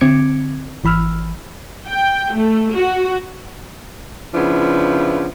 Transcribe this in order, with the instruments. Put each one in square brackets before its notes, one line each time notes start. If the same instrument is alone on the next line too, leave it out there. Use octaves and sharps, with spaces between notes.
[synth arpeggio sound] D3 C4 D6 G#6 C#7 D7
G#1 E3 B5 E6 F6
[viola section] G5
A3
F#4
[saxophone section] C#3 F3 B3 D4 E4